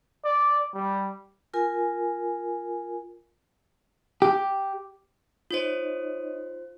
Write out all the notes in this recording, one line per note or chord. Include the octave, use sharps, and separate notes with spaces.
D5
G3
F4 A#4 G#5
G4
D#4 F4 C5 C#5 D#5